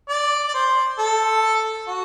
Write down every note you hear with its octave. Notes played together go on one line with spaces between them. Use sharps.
D5
D5
C5
A4
F#4